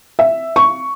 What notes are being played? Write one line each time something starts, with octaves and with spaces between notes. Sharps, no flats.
E5
C#6